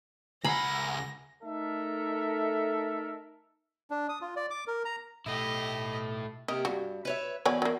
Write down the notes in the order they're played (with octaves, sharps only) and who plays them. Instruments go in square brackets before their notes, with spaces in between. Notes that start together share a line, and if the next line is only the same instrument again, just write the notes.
[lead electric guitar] C#2 F#5 [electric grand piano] G#5 A#5 C7 [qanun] B5 [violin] A#6
[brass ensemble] A3 D#4 A4 A#4 E5
[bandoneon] D4
D#6
F4
D5
D6
A#4
A#5
[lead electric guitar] B1 [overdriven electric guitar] A3 E4 [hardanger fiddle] G4 D#5
[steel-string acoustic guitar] C3 A#3 G4 [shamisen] D#5
[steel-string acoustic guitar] G2 [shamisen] F#4
[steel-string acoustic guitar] B4 C#5 E5
[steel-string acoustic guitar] E2 D5 [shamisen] F#3 C#5 G#5
[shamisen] F#3 A#3